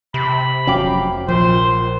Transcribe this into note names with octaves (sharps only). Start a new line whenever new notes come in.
C3 B5
F1 F#3 C#4 F5 G5 D6
A#1 F3 C5